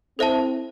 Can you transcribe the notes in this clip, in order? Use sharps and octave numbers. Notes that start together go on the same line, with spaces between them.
C4 E4 A4 C5 E5 A5